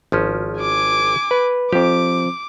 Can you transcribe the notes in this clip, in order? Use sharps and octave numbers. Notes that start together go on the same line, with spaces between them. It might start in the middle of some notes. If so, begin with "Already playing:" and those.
G#1 F3 C#4
G#5 D6
B4
F3 C4 G4 D6